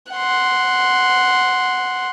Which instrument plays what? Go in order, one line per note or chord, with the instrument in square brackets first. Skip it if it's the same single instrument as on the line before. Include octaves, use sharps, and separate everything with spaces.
[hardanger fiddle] F#5 C6